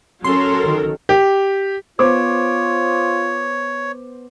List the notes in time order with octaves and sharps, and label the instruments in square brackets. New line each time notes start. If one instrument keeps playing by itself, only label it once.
[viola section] F#3 A4 A#4 [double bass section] C#4 [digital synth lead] C6
[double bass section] D#3
[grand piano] G4
[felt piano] B3 C5 D6 [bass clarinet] F4 [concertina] C#5